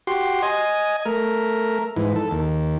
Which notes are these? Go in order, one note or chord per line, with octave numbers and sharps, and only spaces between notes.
F#4 G4 C6
D#5 G#5
A3 A#4
G#2 E3
A4
D#2